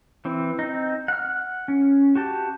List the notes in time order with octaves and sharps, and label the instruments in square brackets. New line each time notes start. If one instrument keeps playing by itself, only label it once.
[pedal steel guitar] E3 C4
C4 D#4
F#5 F6
C#4
F#4 G4 A5